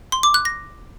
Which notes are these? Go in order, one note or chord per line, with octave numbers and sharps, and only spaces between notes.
C6
D6
F#6
A#6